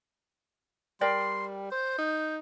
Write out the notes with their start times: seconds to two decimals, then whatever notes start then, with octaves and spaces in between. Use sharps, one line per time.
1.01 G3 A#4 D5 G5 C6
1.72 C5 G6
1.99 D#4